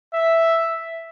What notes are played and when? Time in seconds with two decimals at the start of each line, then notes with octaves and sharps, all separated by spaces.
0.13 E5